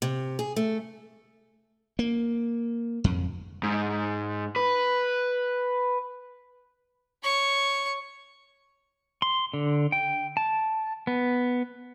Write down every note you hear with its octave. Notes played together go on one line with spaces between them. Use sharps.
C3
G#4
A3
A#3
F2
G#2
B4
C#5 C#6
C6
D3
G5
A5
B3